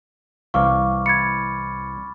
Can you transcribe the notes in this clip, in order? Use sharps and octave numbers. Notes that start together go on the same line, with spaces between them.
C2 E3 F5 C#6 D6 F6
B5 G#6 A6 C#7